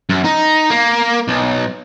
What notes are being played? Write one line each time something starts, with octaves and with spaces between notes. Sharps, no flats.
F#2
D#4
A#3
B1